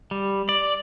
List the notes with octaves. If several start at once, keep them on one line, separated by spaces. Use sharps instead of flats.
G3
D5